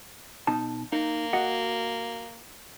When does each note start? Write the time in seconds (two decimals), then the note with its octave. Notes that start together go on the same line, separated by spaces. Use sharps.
0.47 B2 D#4 A5
0.92 A#3 D#4
1.33 F#4 D#5 F#5